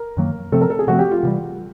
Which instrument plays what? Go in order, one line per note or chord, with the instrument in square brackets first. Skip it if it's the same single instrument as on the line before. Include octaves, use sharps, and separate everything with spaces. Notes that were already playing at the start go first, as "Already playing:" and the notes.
Already playing: [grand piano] A#4
[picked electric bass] F#2 D#3 F#3 A#3
[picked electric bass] C3 F3 A3 C4 [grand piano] A4
[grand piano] A#4
A4
G#4
[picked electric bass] C3 F3 A3 C4 [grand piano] F#4
[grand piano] G4
F4
[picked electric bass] C3 E3 G3